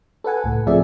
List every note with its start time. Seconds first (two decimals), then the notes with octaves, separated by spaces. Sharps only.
0.24 A4 B4 F#5 G#5
0.44 C#2 A2
0.67 F3 A3 C4 G#4 D5 E5